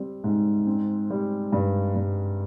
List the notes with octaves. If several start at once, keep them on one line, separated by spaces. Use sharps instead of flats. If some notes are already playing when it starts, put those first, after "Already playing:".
Already playing: G3 C4
G#2
C4
G3
G2
G2